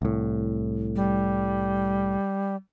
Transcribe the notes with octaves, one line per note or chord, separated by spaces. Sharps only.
C2 A2
G3